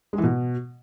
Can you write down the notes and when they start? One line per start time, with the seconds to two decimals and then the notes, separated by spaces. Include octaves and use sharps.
0.13 G#3
0.18 E3
0.23 B2